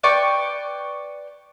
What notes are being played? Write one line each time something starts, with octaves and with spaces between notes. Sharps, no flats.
B4 D5 G5 C#6